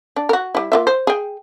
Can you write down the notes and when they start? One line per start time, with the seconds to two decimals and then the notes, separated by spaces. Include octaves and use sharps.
0.16 D4
0.29 F#4 A#4
0.55 G3 E4
0.72 A#3 F4 E5
0.87 C5
1.07 G#4 G5